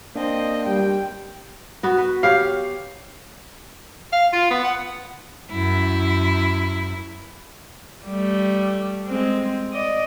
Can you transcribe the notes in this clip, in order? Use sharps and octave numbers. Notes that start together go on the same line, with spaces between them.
A#3 C4 D4 D#5
G3 G5
B3 F#4
B4
G4 C#5 F5
F5
F4
B3
F#5
F#2 E4
G3 A3
G#3 C4
D5 D#5